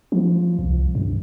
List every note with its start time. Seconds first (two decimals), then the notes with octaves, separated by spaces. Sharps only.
0.12 F3
0.59 C2
0.95 G2